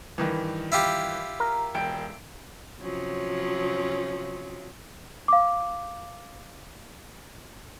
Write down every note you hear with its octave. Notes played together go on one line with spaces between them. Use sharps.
G2 D#3 E3
E4 F4 G4
A#4
E1 G5 D7
C3 F3 F#3 C#4
F5 D6